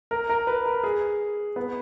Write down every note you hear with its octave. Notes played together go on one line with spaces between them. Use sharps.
A#4
A#4
B4
A#4
G#4
B3